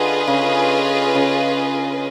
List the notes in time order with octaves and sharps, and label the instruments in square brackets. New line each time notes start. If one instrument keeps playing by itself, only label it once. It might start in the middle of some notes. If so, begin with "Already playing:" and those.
Already playing: [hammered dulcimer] D3 [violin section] F4 G#4 B4 D#5
[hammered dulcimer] C#3
C#3